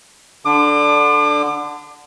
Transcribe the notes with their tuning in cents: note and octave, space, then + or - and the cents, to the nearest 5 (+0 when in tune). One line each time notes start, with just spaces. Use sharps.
D3 +0 D4 +0 D6 +35